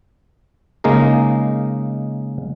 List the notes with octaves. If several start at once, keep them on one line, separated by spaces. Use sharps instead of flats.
C#3 G#3 A#3 D#4 A#4